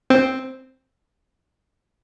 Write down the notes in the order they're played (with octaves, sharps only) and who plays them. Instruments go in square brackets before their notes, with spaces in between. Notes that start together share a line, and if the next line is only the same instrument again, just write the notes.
[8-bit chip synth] C4